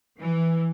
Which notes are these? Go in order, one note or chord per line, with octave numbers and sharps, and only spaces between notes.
E3